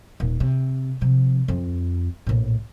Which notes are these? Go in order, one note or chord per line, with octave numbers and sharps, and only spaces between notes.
D#1
C3
C3 F3
F2 F4
A#1 A2